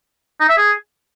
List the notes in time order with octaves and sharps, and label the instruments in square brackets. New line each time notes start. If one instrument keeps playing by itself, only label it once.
[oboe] D#4
E5
G#4